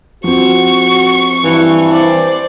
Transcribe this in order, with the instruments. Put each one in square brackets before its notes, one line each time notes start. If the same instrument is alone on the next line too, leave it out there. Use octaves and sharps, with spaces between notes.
[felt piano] F3 C4 [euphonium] F#4 [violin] C#6
[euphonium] G2 [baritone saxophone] E3
[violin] C5 D5